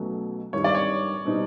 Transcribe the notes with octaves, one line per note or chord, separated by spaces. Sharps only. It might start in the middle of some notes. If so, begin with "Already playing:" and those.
Already playing: B1 B2 F#3 A3 C#4
G#1 G2 D#3 G3 C#5
D5
C#5
B2 G3 C4 D#4